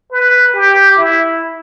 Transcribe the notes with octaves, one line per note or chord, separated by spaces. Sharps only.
B4
G4
E4